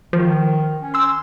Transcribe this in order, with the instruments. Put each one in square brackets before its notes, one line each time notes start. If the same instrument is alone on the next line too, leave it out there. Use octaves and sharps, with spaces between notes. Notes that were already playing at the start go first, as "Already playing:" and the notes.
[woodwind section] D#3 [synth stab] F3
[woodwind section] C#4
[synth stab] C6 E6